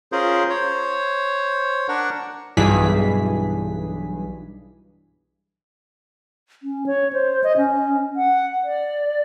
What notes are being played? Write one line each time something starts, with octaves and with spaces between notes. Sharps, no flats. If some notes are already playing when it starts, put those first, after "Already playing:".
C#4 F4 G#4 A#4 C5
C5 C#5
D4 A#4 F#5 C#6
B1 G2 E3 G#4 B6
C#4
C#5
C5
D#5
C#4
F#5
D5